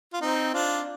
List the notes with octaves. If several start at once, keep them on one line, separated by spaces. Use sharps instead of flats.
F4
C4 D#4
D4 F4